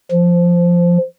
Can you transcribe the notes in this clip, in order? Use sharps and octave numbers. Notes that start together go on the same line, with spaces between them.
F3